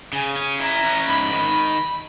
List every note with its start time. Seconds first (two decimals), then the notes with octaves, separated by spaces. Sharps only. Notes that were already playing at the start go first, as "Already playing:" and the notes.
0.13 C#3 G#5
0.36 C#4
0.60 E4 A#5
0.83 C#4
1.07 G#2 B5
1.31 D#3